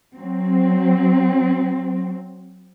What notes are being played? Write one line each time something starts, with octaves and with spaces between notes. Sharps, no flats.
F#3 C4